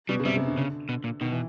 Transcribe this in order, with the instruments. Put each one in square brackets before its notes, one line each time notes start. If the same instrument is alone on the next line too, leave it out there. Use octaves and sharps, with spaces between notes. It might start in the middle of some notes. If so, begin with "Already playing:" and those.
[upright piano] B2 [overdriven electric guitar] G3
[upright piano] C#3
[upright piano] C3 [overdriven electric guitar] G3
[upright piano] C#3
D3
[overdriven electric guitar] C#3
B2
A#2
[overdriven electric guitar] B2 [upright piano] D#3
[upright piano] E3